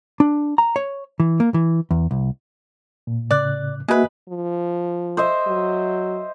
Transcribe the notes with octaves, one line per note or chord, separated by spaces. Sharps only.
D4
A#5
C#5
E3
A#3
E3
E2
C2
A#2
A2 C#3 D5 F#6
G#3 A#3 F#4 B4 E5
F3
C5 D#5 E5
F#3